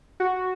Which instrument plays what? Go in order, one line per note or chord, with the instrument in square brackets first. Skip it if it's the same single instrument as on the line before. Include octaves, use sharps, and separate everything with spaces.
[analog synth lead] F#4